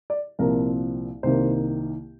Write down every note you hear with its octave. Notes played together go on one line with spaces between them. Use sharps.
D5
C2 A#2 F3 C4 A#4
C2 C3 D#3 A#3 C5